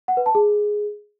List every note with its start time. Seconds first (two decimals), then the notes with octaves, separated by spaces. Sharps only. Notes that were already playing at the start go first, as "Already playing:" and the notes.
0.08 F#5
0.17 B4
0.26 A5
0.35 G#4